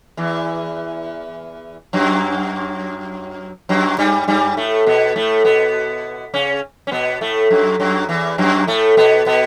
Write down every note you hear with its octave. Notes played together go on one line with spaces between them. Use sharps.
E2 E3
F#2 F#3
F#2 F#3
G2 G3
G2 G3
A2 A3
B2 B3
A2 A3
B2 B3
C#3 C#4
C#4
B2 B3
A2 A3
F#2 F#3
F#2 F#3
E2 E3
F#2 F#3
A2 A3
B2 B3
B2 B3